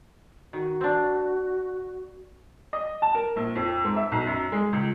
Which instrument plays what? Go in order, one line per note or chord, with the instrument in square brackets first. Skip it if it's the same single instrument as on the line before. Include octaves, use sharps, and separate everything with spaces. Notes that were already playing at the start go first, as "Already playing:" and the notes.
[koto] D#3 [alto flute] F#4
[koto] C4 D4
[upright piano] D#5
A5
A#4
A#1
F2
G#2
E5
B1
F#2
G#3
C#2